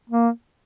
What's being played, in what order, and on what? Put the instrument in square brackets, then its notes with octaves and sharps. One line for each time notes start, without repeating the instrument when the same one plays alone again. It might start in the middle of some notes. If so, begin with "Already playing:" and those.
[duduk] A#3